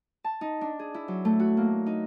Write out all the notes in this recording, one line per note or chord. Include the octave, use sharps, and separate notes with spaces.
A5
D#4
D4
G#4
E4
F#3
A3
F#4
A#3
D#4